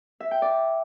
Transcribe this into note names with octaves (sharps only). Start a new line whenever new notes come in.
E5
G5
D5